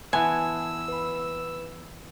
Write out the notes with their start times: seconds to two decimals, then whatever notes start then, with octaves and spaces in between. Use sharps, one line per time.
0.13 E3 B3 G#5 A5 C6 E6
0.88 B4 B5